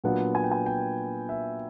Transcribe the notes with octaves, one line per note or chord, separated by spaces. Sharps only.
A#2 F#3 B3 D4 F4 F#5
G#5
G5
G#5
G5
E5